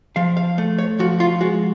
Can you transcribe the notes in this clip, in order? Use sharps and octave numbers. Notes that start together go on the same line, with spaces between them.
F3 F5
F5
A3
C#5
F3 F#4
F4
G#3 F#4